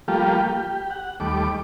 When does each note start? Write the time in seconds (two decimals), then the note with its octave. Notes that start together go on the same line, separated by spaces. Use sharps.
0.08 F3 G3 A3 A#3 F4 G4
0.46 G4
0.90 F#5
1.20 D#2 G3 A3 D6